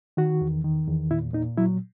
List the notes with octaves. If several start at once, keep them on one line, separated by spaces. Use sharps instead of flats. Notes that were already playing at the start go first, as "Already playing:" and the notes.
D#3 F#4
E2
D#3
E2
A#2 E4
A#2 D#4
F#3 E4